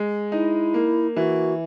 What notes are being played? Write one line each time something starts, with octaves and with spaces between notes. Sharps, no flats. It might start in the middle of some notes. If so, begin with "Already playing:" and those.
Already playing: G#3
D#4 E4
A#3
E3 F#4